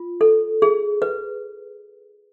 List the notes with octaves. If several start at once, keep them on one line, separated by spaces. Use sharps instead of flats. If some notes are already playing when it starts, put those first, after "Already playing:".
Already playing: F4
A4
G#4
B4